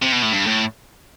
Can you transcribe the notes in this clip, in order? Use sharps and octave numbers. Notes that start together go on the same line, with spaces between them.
C3
B2
A2
G2
A2